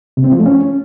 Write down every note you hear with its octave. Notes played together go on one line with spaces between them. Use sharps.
C3
C4
F3
A3
C#4